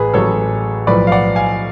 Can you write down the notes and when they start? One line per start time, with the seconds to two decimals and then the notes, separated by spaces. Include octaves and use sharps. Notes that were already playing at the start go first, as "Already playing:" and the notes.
Already playing: A1 A2 G#4 B4
0.14 A1 A2 F#3 A4 C#5
0.87 B1 A2 F3 B4 D5
1.07 F5
1.12 D5 F#5
1.36 F5 G#5